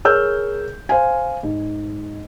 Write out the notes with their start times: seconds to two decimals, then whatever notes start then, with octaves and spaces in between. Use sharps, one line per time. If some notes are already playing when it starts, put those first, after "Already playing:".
0.05 G#4 A#4 C#5 E6 F6 G6
0.89 C5 F5 G#5
1.43 G#2